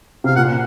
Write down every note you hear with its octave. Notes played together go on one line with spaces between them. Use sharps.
C3 F5
A#2 F#5